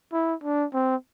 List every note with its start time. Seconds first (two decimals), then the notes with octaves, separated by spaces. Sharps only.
0.12 E4
0.44 D4
0.74 C4